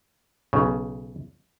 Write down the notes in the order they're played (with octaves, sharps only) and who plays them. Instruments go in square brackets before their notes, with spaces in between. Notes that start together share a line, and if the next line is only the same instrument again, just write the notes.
[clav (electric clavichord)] B1 C#3